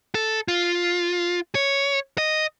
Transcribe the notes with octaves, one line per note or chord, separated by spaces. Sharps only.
A4
F4
C#5
D#5